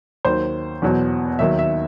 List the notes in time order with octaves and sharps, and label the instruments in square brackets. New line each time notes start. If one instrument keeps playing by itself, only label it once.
[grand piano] D#2 D#3 F#3 C5
E2 B2 F#3
D#2 D#3 F#3 E5
E5